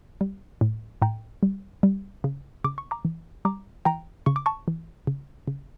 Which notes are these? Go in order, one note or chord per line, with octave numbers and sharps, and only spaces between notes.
G3
A2
A2 G5 A#5
G3
G3
C#3
C#3 D6
C#6
A#5 D6
E3
G3 A#5 D6
E3 G5 A#5
C#3 C#6
D6
A5 C#6
E3
C#3
C#3